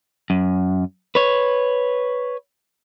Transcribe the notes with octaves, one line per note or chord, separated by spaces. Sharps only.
F#2
B4 C#5